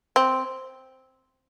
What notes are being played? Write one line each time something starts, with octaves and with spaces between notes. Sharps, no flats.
C4